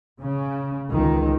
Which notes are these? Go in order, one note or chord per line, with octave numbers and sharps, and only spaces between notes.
C#3
C#2 D#3